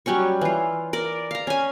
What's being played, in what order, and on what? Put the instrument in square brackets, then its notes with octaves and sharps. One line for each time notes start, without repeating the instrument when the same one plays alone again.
[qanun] F#3 G3 C#4 C#6
E3 F4
A#4 D5
F5 A#5
C#4 G#5